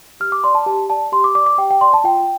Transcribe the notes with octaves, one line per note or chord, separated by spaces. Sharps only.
G4 F6
D6
D5 C6
A5
G4 A5
D5 A5
G4 C6
D6
D5 D6
D6
G4 G5
G5
D5 C6
A5
F4 G5